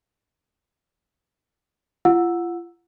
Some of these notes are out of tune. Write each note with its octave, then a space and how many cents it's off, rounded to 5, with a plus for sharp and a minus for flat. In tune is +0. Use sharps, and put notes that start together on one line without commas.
F4 -35 F#5 -20 E6 +0